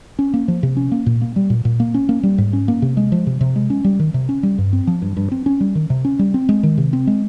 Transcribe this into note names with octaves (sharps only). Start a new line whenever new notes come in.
C#4
A#3
F3
C3
C#4
A#3
A#2
A#3
G3
A#2
A#2
A#3
C#4
A#3
G3
G#2
C#4
A#3
C3
G#3
F3
C3
C3
G#3
C#4
G3
D#3
C3
C#4
G3
G2
C4
F3
G2
G2
C4
C#4
G3
D#3
C3
C#4
G3
C4
G#3
D#3
C3
C4
G#3